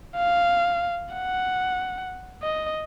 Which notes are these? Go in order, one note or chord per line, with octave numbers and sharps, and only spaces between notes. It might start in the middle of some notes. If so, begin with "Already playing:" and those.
F5
F#5
D#5